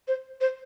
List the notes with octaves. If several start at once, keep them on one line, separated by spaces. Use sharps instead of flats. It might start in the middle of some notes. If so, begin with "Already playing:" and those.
C5
C5